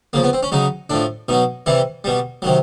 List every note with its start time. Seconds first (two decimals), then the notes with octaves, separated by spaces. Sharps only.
0.13 C#3 F3 A#3
0.23 B3
0.33 C4
0.43 C#4
0.52 C#3 F#3 D#4
0.90 A2 F3 D4
1.29 B2 F#3 D#4
1.66 C3 E3 G3 E4
2.04 B2 G3
2.42 C3 D#3 F#3